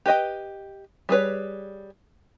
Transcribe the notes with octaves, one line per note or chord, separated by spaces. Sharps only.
G4 B4 D#5 G5
G3 G#4 B4 C#5